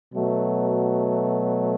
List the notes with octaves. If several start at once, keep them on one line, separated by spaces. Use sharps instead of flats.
B2 F#3 A3